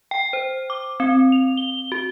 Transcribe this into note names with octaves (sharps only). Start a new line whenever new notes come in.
G5
C5
D6
C4
F7
G7
F#4